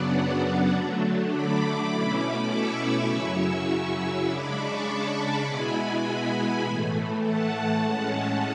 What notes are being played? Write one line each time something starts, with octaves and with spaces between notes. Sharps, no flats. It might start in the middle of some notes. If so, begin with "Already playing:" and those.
Already playing: F#2 C#3 F#3 B3 D4 D5 F#5
D3 F#3 A3 D4
B5 D6
B2 A3 C#4 E4
C#6 E6
B5 D6
F#2 C#3 F#3 C#4 E4 C#6 E6
C#3 G#3 D4 B5 D6
A5 C#6
A5 C#6
A5 C#6
B2 G#3 B3 E4 G#5 B5
A2 E3 A3
F#5 A5
A2 G#3 C#4